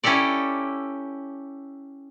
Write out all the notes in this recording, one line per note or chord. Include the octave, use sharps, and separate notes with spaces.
C#4 E4 G4 A4 D5